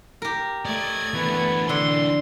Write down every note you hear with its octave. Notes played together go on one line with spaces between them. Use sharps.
G4 A#4
A3 D5 D#5 G#6
E3 B3 D4
D3 C6